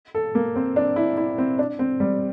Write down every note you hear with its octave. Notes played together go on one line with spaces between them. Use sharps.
A4
A#3
C4
D4
E4
E4
C4
D4
C4
G3